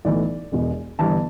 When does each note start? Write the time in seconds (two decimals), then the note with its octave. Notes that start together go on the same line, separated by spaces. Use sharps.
0.05 B1 A2 E3 D5
0.52 E1 E2 B2
0.99 G1 G2 E3 A5